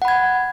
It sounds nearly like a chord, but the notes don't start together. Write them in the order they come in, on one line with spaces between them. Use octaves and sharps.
F#5 B5 G#6